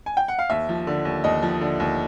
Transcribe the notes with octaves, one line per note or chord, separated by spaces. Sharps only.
G#5
G5
F#5
F5
D#2 E5
F3
D3
D#2
D#2 D#5
F3
D3
D#2